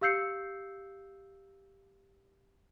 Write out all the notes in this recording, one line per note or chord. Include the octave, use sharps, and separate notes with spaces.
G4 F5 E6 G6 C7 C#7